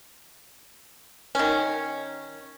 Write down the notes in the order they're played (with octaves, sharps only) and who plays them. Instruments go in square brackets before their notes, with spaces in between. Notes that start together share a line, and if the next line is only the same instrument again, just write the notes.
[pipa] D#3 C#4